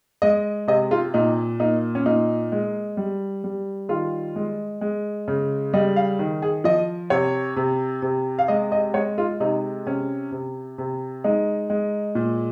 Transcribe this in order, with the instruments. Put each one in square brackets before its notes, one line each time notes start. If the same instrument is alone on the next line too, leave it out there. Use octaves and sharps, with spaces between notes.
[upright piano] G#3 D#5
C3 D#5
F4
A#2 D#4
A#3 D#4
C#4
A#2 D#4
G#3
G3
G3
D#3 F4
G#3
G#3
C#3
G3 D#5
F5
D#3
G#4
F3 D#5
C3 C#5
C3
C3
F5
G#3 D#5
D#5
G#3 C#5
F4
C3 D#4
C3 C#4
C3
C3
G#3 D#4
G#3
A#2